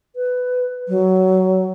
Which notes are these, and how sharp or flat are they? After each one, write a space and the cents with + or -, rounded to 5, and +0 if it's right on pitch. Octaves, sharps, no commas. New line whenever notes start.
B4 +15
F#3 +15